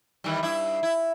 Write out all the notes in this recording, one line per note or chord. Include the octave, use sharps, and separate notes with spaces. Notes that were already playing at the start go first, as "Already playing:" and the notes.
D#3 E3 G3
G2 E4
E4